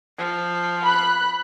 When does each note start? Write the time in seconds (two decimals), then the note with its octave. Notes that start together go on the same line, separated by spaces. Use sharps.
0.18 F3
0.84 B5 F#6